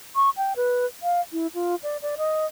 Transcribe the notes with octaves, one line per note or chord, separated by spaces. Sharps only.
C#6
G5
B4
F5
E4
F4
D5
D5
D#5